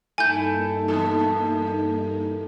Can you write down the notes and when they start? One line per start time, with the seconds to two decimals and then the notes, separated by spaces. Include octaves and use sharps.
0.18 G2 A3 A#3 D#4 E4 G#5 G6
0.88 A#2 E3 A4